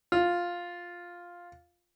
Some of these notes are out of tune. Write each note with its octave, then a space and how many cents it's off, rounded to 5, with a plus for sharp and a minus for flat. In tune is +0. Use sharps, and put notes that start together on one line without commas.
F4 +5